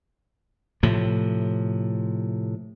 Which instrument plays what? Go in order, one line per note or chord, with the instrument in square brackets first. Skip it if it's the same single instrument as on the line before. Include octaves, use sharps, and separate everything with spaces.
[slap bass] A2 C3 F3